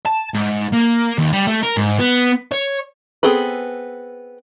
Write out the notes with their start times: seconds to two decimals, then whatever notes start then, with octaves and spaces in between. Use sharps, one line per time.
0.06 A5
0.34 G#2
0.73 A#3
1.18 D#2
1.32 G3
1.47 A3
1.63 A#4
1.77 G#2
1.99 B3
2.52 C#5
3.23 B3 C4 G#4 A4 B4